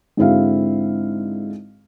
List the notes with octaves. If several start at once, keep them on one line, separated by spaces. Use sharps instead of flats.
G#2 D3 C4 E4 F#4 F5